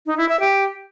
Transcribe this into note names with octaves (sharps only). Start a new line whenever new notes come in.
D#4
E4
E5
G4